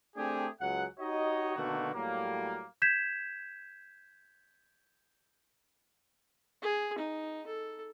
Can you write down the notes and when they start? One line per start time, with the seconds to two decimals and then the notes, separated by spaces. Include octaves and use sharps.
0.16 A3 C4 D4 G4 G#4
0.60 C#2 F#3 G#4 F#5
0.99 D#4 F#4 G4 C#5 D#5
1.56 B2 D3 D#3 A3 A#3 F#4
1.94 A2 F#3 G3 A#3
2.82 G6 G#6 B6 E7
6.62 G#4
6.98 D#4
7.47 A4